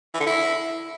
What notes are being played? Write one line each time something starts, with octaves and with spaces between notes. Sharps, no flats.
E3
D3
E4